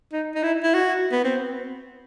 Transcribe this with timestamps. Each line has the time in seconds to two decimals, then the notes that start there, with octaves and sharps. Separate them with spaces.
0.13 D#4
0.35 D#4
0.43 E4
0.63 E4
0.74 F#4
1.12 B3
1.24 C4